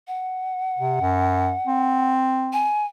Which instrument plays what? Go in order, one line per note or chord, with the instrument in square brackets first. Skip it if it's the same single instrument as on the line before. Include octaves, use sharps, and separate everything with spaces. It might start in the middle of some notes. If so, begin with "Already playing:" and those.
[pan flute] F#5
[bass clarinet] C3
F#2
C4
[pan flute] G#5